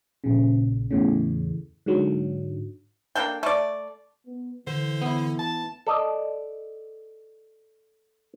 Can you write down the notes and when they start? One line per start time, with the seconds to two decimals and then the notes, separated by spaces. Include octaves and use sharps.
0.24 A#1 C#3
0.91 E2 A2 C#3
1.86 G#2 D3 F#3
3.15 A#3 D4 A4 G5
3.43 A3 D5
4.26 B3
4.67 D3 E3 C5
5.02 B3 E4
5.39 A5
5.87 A4 D5 D#5